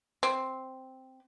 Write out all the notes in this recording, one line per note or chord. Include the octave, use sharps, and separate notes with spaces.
C4